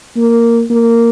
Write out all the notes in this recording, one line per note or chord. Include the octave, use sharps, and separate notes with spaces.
A#3
A#3